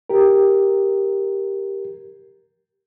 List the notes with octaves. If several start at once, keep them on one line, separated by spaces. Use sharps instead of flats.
G4 A#4